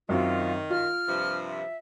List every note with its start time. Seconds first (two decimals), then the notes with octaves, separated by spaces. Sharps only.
0.09 F#2 D#3 C4 F4
0.70 F4 F6
1.08 G2 C3 F3
1.48 E5